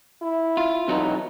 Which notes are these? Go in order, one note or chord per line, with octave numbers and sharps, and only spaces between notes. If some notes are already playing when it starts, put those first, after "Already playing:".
E4
F4
E2 B2 F#3 D#4